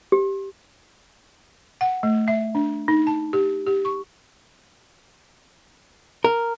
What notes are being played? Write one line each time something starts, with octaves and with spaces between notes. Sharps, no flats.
G4
F#5
A3
E5
D4
D#4
A5
G4
G4
C#6
A#4